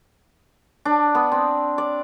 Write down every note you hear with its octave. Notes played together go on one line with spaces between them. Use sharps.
D4
B3
C4
D5